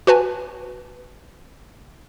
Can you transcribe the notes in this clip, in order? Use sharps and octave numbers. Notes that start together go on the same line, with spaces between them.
F#4 B4 G#5 A5